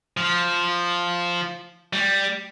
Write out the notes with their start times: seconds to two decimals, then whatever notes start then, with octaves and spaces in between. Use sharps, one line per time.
0.17 F3
1.93 G3